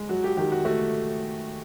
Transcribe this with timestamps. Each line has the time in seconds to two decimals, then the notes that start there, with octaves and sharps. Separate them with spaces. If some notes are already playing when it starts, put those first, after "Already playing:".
Already playing: G#3
0.09 F#3 F#4
0.24 G4
0.37 D#3 G4
0.52 F#4
0.65 A3 F#4